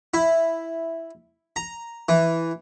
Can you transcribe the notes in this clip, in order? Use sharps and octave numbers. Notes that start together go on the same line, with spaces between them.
E4
A#5
E3